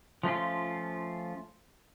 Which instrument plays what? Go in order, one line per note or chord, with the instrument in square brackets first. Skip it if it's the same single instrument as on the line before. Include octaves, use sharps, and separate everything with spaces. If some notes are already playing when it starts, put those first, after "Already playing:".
[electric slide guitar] F3 A3 C#4 F4